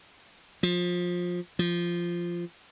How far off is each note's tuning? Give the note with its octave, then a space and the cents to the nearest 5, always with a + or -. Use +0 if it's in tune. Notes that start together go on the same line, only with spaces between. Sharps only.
F3 +20
F3 -10